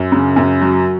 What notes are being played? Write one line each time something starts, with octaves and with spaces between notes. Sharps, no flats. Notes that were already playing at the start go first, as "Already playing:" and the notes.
Already playing: F#2
C#3
F#2
F#3